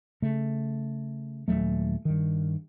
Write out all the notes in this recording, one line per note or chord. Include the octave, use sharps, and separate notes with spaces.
C#3 A3
D#1 F#2 F#3 A3
G2 D#3